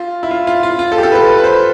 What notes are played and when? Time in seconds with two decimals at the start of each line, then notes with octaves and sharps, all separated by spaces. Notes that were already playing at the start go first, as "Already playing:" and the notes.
Already playing: F4
0.23 E4
0.31 F4
0.47 F4
0.63 F4
0.79 F4
0.92 A4
0.98 G4
1.03 A4
1.12 B4
1.15 A4
1.28 B4
1.38 B4
1.44 C5